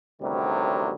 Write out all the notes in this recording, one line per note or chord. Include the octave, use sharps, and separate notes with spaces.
A1 D2 C3 D#3 F#3 G3